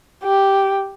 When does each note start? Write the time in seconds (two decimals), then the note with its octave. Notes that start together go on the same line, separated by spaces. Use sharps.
0.24 G4